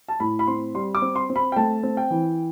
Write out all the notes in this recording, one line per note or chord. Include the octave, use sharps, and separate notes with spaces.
A5
A2 B5
B5
C4 C6
G3 C6
D6
C4
C6
C4
B5
G5
A3 A5
C4
G5
E3